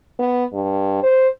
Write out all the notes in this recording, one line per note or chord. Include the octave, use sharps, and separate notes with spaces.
B3
G2
C5